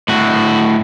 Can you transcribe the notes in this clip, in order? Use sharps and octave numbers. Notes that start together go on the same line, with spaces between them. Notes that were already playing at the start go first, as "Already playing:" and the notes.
A2 F#4